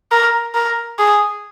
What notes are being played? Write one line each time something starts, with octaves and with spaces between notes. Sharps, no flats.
A#4
A#4
G#4